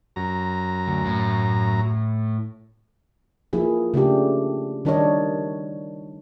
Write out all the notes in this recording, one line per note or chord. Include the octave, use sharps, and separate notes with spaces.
F#2 A#5
D2
A2
F3 A#3 E4 G#4
C#3 A3 D4 G4
D#3 G3 D4 F#4 C#5 D#5